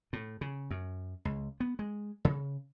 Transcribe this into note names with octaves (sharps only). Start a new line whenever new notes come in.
A2
C#3
F#2
C#2
B3
G#3
C#3